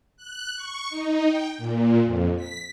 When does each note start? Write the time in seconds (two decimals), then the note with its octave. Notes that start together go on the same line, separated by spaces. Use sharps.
0.17 F#6
0.56 C#6
0.90 D#4
1.27 G5
1.58 A#2
2.04 F2
2.36 B6